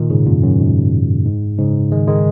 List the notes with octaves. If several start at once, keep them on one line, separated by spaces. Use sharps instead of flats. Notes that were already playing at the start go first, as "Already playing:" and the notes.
Already playing: A#2 D#3
G#2 C#3
F#2 A#2
F#2
G#2
G#2
G#2 C#3
D#3 G#3
D#3 G#3